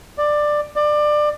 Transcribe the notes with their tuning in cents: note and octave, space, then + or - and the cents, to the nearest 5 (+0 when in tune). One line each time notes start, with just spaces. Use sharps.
D5 +15
D5 +25